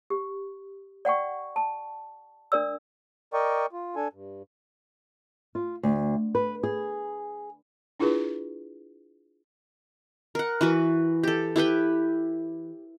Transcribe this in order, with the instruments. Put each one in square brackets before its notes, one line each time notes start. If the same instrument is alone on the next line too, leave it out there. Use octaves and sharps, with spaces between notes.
[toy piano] G4
D5 F#5 G5 C#6
A5
D4 A#4 D5 E6
[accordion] A#4 D5 D#5 G5 C#6
F4
D4 A4 G#5
G2
[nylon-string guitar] F4
D2
B4
G#4
[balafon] D4 E4 F4 G#4 B4
[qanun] A#4 F#5
E3 F#4 B4
G4 A4
E4 G4 B4 G5